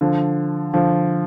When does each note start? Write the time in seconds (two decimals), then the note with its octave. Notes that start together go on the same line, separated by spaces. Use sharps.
0.01 D3 F3
0.74 D3 F3